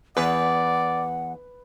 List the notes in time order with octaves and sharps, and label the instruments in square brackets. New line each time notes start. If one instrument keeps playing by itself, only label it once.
[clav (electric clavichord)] E2 [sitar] B4 [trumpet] D5 [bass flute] F#5